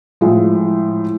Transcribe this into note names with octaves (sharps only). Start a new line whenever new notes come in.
A2 F3 G#3